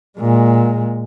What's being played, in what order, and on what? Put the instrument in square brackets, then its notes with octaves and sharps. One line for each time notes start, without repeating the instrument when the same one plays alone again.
[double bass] A#2 G#3